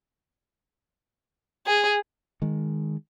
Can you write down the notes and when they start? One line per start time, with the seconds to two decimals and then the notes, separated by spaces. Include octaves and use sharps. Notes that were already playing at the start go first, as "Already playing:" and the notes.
1.67 G#4
2.42 D#3 G#3